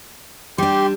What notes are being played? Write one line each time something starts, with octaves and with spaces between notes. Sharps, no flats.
G3 D4 G4 C6